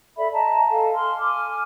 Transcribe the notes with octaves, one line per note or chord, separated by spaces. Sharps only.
A4 D5 E5 B5
D#5 A5 A#5
A4 F5 G#5
C6 F6
G#5 D6 F6